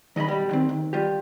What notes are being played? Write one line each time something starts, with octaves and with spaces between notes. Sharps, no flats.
D#3 D#5 A#5 B5
B1 G3
D#3 C4
D#3
G3 F4 G4